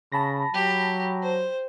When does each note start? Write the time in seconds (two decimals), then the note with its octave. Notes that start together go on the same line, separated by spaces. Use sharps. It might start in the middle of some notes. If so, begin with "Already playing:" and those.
0.12 C#3 A5 B5 A#6
0.54 F#3 G4
1.22 C5